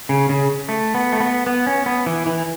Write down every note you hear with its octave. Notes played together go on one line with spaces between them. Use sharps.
C#3
C#3
A3
B3
A3
B3
B3
C#4
B3
E3
E3